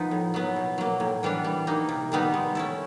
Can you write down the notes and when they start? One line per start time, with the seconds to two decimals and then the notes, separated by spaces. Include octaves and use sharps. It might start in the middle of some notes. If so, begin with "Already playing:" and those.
Already playing: F3 B3 D#4
0.11 A2
0.34 F#3 B3
0.56 B2
0.78 F#3 A#3
1.00 A2
1.23 E3 G3 B3 D4
1.44 G3
1.67 A#3 D#4
1.89 C3
2.12 D#3 G3 B3 D#4
2.34 G#3
2.55 C#4 E4 A4